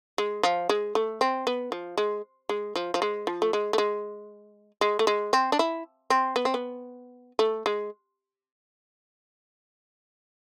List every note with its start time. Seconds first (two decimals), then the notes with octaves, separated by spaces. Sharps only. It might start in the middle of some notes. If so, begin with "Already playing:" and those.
0.18 G#3
0.43 F3
0.69 G#3
0.95 A3
1.21 C4
1.47 B3
1.72 F3
1.98 G#3
2.49 G#3
2.76 F3
2.94 F3
3.02 G#3
3.27 F3
3.42 A3
3.53 G#3
3.73 A3
3.78 G#3
4.81 G#3
4.99 A3
5.07 G#3
5.33 C4
5.52 D4
5.59 E4
6.10 C4
6.36 B3
6.45 C4
6.54 B3
7.39 A3
7.66 G#3